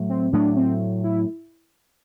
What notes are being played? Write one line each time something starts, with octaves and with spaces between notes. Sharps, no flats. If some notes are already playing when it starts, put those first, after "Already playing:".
Already playing: A2 F#3 A3
C4
A2 F#3 A3 D4
C4
E4